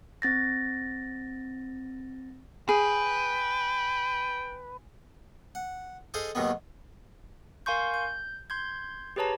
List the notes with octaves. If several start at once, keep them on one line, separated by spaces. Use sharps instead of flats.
C4 A6 A#6
G#4 B4 G5
F#5
G#4 A4 C5 D#5 F5 G#5
D#2 B2 D#3 F#3 G#3 B3
A#4 F5 G#5 C6 C#6 G6
G6
C6 G6 G#6
G4 G#4 B4 C#5 A5 A#5